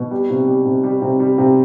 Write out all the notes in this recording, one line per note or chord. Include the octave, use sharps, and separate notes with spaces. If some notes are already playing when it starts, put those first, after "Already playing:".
Already playing: B2
G3
C3
G3
C3
G3
C3
G3
C3